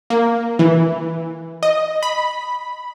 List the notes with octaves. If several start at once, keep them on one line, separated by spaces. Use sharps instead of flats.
A#3
E3
D#5
B5